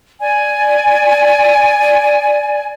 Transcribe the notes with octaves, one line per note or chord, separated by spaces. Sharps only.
D5 G#5